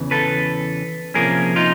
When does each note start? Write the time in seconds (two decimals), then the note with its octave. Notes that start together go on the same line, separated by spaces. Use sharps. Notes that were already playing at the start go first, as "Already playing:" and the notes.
Already playing: E2 C#3 E3
0.11 A4 B4
1.14 C3 F3 A#3 C#4 G#4 A#4
1.56 D#4 F4